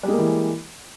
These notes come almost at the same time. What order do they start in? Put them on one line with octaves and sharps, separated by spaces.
G3 G#3 A#3 E3